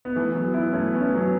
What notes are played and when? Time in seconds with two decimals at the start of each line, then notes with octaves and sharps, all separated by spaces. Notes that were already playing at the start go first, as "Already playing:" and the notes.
0.05 B3
0.16 E3 A3
0.34 F#3 B3
0.54 B3 E4
0.73 A3 C#4
0.94 B3
1.01 A3 C#4
1.15 F#3 B3